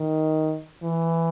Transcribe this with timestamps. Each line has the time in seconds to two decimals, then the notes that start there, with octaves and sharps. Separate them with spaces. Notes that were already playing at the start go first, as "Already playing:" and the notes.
Already playing: D#3
0.83 E3